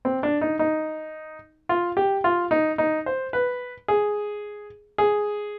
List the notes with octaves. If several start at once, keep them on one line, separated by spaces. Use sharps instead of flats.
C4
D4
D#4
D#4
F4
G4
F4
D#4
D#4
C5
B4
G#4
G#4